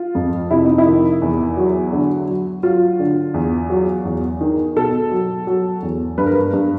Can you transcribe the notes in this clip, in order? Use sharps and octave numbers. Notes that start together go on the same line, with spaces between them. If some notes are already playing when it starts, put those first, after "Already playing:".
Already playing: F4
F2
C3 E4
D#4
E4
D#3
E2
F#3
D3
F#3
F#3 F4
D3
E2
F#3
E2
D#3
B2 A4
F#3
F#3
E2
G2 B4
A#4
B4
G2